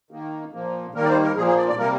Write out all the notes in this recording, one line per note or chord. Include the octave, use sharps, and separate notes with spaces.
D#3 A#3
A#2 F3 A#3
D#3 G3 A#3 A#4
D5
C5
A#4
A#2 F3 A#3 G#4
G#4
D5
D5
C3 G3 A#3 A#4